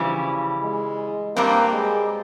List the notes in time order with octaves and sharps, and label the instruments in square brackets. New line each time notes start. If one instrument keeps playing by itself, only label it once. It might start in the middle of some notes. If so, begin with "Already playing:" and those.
Already playing: [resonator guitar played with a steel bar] C#3 E3 G3 [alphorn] F3
[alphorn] G#3
[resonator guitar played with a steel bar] G2 G3 C4 [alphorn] A#3
[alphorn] G#3